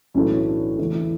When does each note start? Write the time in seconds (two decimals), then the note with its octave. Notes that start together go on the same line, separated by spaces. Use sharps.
0.14 B1 A2 E3 A3 C#4
0.46 D4
0.78 E2 D3 A3 E4
0.95 E4